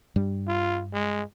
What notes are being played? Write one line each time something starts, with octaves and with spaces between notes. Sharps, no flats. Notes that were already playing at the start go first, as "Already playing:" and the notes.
G2 G3
F4
G#3